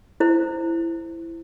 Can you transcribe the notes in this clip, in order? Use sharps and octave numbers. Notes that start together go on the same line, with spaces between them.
E4 C5